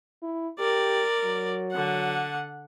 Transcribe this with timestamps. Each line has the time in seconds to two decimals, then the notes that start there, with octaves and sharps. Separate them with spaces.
0.22 E4
0.59 G4 A#4 D5
1.24 F#3
1.72 D3 F#5